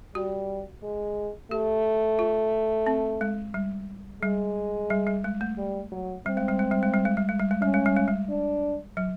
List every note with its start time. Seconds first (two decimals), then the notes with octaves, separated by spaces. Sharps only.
0.15 G3 F#4
0.83 G#3
1.51 A3 G4
2.19 F4
2.87 C4
3.21 G#3
3.54 G3
4.22 G3 G#3
4.90 G3
5.07 G3
5.24 G#3
5.41 A3
5.58 G3
5.92 F#3
6.26 G3 C4
6.37 G#3
6.49 G3
6.59 G#3
6.71 G3
6.83 G#3
6.94 G3
7.05 G#3
7.17 G3
7.29 G#3
7.39 G3
7.51 G#3
7.62 G3 C#4
7.74 G#3
7.86 G3
7.96 G#3
8.08 G3
8.29 D4
8.97 F#3